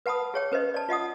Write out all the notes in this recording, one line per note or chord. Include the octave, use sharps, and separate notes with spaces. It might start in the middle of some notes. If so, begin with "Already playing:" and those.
B4 F#5 A5 B5 D#6
G#4 C#5 G5
C#4 B4 C5 D#5
D5 A5
F4 D#5 F#5 D#6